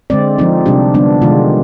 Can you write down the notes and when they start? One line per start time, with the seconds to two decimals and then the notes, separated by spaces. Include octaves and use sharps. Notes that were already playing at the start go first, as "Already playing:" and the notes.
0.10 D3 G#3 C4 D5
0.38 F3 C4 D#4
0.66 C3 G3 D4 G4
0.94 D3 G3 B3 D4
1.22 C3 D#3 G#3 F4